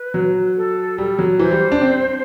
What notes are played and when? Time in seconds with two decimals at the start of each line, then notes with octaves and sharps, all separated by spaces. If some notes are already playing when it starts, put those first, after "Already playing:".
Already playing: B4
0.14 F#3
0.56 A4
0.98 G3
1.19 F#3
1.39 E3 C5
1.51 G3
1.72 D4
1.81 C4